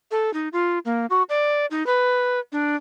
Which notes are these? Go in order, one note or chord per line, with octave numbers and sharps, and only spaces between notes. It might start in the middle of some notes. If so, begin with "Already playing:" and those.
A4
D#4
F4
A#3
F#4
D5
D#4
B4
D4